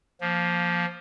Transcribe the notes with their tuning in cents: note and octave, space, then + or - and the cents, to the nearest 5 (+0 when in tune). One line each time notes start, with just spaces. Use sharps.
F3 +0 A#3 +10